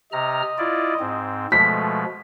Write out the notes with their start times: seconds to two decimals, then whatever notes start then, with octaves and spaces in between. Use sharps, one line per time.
0.13 C3 D#5 A#5 F6
0.58 E4 F4 D5
1.00 G#2 C4
1.52 B2 F3 G#3 A3 B6